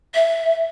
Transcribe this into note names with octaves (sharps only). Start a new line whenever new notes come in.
E5